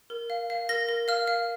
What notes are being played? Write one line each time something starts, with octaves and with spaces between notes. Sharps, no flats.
A#4
F5
F5
A#4 A#6
A#4
F5 F6
F5